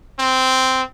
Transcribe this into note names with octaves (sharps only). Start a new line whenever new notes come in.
C4